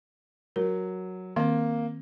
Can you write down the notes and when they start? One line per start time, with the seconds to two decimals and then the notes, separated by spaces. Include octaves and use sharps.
0.56 F#3 A#4
1.36 D#3 A#3 C4